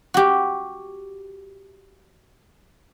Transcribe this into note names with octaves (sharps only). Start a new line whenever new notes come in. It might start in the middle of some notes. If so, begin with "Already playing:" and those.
F#4 G4